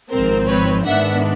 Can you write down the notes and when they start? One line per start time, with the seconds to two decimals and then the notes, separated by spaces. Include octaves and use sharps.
0.11 G#1 G#2 F3 G#3 C4 A#4 C5
0.47 B4 C#5
0.85 G#2 D#3 G#3 B3 D4 E5 F#5